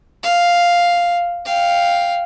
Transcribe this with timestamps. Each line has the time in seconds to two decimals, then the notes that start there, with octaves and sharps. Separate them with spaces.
0.24 F5
1.46 F5 G5